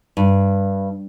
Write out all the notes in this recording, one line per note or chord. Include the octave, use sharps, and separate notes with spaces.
G2